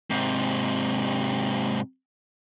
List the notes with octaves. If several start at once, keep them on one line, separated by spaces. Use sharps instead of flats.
G#2 C3